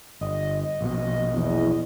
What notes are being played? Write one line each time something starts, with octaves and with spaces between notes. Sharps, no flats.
G1 D#5
A#1 B2
E2